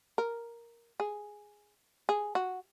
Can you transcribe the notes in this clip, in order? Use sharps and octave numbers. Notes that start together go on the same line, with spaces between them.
A#4
G#4
G#4
F#4